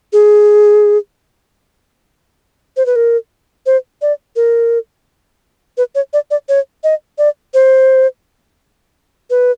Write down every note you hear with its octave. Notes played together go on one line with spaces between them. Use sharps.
G#4
C5
B4
A#4
C5
D5
A#4
B4
C#5
D5
D5
C#5
D#5
D5
C5
B4